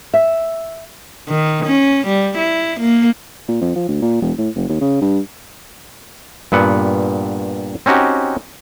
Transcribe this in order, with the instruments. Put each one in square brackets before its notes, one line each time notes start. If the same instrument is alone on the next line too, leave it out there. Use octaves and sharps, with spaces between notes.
[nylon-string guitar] E5
[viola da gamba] D#3
C#4
G3
E4
A#3
[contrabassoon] A#2
F2
F3
D2
A#2
E1
A2
F#1
D#2
C#3
G2
[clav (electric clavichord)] G2 A#2 B3 F#5
C4 C#4 D#4 F#4 G4